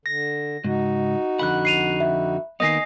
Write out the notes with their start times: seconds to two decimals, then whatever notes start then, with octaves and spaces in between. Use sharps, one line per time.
0.06 D3 A#6
0.64 C#2 G#2 D#4 F#4
1.39 F2 D3 F#5 B5 F#6
1.65 C7 D#7 F7
2.00 E5
2.60 D#3 A#3 B3 D#5 G#5 D#6 A#6 C7